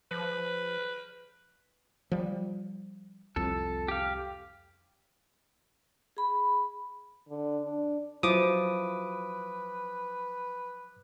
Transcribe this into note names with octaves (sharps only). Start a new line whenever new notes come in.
F3 B4
F3 G3
C2 F2 A4
G4 F5
G#4 B5
D3
D4
F3 F#3 E4 B4 D6 D#6